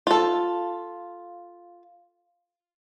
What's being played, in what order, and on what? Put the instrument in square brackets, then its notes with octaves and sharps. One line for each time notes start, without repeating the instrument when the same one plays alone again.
[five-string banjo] F4 A4